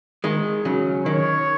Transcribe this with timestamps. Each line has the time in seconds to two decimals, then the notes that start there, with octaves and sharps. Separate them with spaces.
0.24 D#3 G#3
0.65 C#3 F#3
1.06 D#3 C#5